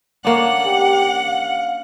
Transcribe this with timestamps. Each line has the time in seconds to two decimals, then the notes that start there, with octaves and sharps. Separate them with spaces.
0.25 A#3 C#4 D4 F#5
0.65 G4
1.25 F5